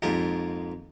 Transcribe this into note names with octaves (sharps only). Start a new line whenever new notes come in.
F2 G#2 A#3 G4 D#5